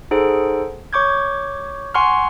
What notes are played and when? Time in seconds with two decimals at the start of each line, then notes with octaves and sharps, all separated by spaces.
0.11 D#4 G#4 A4 C5 F#5 D7
0.93 C#5 C#6 D6 G6 G#6
1.94 F#5 G#5 C6 C#6 F6